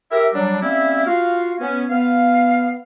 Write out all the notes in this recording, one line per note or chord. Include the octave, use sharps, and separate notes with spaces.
G4 A#4 E5
F#3 G3 D4
G3 A#3 C4 C#4 E4 E5
F4 F#4 F5
B3 C#4
B3 F5